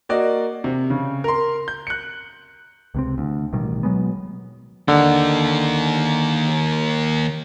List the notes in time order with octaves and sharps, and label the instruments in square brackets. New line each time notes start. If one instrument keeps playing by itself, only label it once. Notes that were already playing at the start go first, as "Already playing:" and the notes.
[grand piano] A#3 F#4 D5 D#5
C3
C#3
A#4 C6
G6
F#6 C#7
[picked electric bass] C#2 C3 C4
D2
A1 B2 D#3 G3
B2 F#3 G#3 B3
[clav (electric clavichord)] D3 [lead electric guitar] D#3 A#3